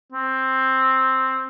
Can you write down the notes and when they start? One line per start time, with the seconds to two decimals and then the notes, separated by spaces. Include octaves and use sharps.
0.13 C4